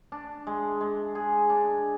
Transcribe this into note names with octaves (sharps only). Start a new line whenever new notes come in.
D4
G#3
G#3
G#4
D4